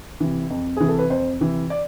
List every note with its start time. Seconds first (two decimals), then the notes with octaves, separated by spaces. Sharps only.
0.20 C3 E3
0.50 F2
0.77 C3 E3 G#4
0.88 A4
0.99 B4
1.10 F2 C5
1.40 C3 E3
1.70 D5